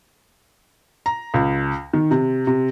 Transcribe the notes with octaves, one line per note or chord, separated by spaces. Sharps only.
A#5
C#2
D#3
C3
C3